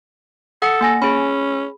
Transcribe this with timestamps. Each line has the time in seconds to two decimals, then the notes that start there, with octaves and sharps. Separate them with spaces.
0.62 A4 F#5 D#6 C#7
0.81 A#3 G#5 A#6
1.02 C#4 G#4 B5